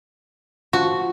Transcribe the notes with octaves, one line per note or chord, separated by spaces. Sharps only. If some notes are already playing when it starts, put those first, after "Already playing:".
F3 F#4